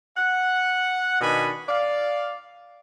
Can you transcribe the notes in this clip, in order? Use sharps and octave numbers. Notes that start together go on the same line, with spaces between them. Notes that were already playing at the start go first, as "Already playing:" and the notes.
F#5
B2 D#3 D4 G#5 B5
D5 F5